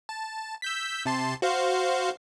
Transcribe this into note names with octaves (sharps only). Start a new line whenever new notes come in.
A5
E6 G6 B6
C3 A5 C6
F#4 C5 F5